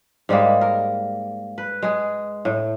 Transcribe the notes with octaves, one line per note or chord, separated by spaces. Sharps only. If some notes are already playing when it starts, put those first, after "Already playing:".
G#2 G3 G#3 A#3
A#4
B4
G#3 G#4
A2